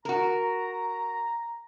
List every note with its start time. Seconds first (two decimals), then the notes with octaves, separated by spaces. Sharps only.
0.05 F#4 A#4 A#5